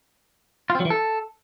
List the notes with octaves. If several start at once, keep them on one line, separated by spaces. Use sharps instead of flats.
F4
C4
F#3
E3
A4